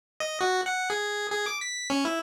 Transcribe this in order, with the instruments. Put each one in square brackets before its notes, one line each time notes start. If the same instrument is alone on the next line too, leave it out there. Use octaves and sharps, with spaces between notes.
[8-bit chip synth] D#5
F#4
F#5
G#4
G#4
D6
B6
C#4
E4